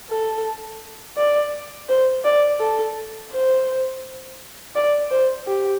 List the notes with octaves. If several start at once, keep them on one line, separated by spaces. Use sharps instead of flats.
A4
D5
C5
D5
A4
C5
D5
C5
G4